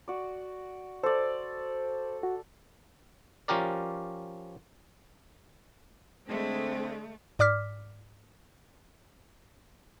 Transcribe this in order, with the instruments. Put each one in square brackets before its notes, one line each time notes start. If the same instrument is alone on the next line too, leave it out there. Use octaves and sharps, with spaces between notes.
[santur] F#4 D5
[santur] A4 D5 [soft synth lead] C5
[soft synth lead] F#4
[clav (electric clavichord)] F3 C#4 G4 A#4 D5
[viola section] D3 G#3 [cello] A3 [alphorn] C4
[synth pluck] G#2 D5 D6 F6 B6